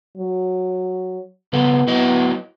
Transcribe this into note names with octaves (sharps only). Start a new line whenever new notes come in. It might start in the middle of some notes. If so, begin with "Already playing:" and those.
F#3
C#3 F3 B3 A4
F#3 B3 E4 D#5